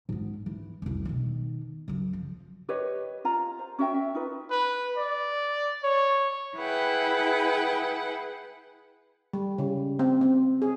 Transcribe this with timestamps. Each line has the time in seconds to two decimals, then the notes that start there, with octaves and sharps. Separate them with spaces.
0.09 G#2 B3
0.46 E3
0.82 F1 C2
1.05 B2 D#3
1.88 F#2 C#3
2.13 F3
2.69 G4 B4 C#5 D#5
3.25 F4 F5 A#5
3.59 C5
3.79 C#4 F#4 E5 G5
3.94 E5
4.15 D#4 F4 B4
4.51 B4
4.97 D5
5.83 C#5
6.57 E4 G#4 B4 F#5 G5
9.33 G3
9.58 C#3
9.99 C4
10.21 C4
10.62 G#4